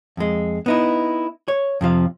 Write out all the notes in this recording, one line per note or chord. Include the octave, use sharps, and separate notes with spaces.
F2 G#3
B3 D#4 E4
C#5
F2 C3 F3 F5